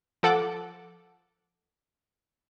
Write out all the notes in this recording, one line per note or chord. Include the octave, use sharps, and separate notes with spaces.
F3 A4 F#5 D6